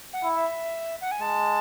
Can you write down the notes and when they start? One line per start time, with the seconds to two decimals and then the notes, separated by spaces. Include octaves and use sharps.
0.13 F#5
0.24 E4
0.35 E5
1.01 F#5
1.12 G#5
1.21 G#3 A5